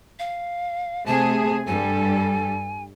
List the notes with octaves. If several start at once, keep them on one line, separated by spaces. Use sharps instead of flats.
F5
C3 A3 G#4 A5
G2 G3 A4 G#5